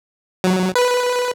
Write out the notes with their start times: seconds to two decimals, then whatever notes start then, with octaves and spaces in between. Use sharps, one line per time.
0.44 F#3
0.75 B4